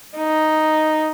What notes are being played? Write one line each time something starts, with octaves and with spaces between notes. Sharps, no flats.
D#4